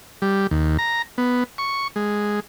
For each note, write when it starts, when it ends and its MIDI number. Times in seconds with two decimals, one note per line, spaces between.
0.22 0.47 55
0.51 0.77 39
0.79 1.02 82
1.18 1.44 59
1.58 1.88 85
1.96 2.40 56